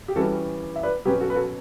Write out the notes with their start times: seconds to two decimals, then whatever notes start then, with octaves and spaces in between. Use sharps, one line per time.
0.08 G4
0.16 E3 G3 C#4 F#4 A4
0.76 E5
0.83 B4 D5
1.05 B2 F#3 C#4 G4 B4
1.20 F#4 A4
1.30 B4
1.35 F#4 A4